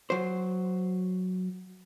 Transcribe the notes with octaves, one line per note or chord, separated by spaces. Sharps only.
F#3 C5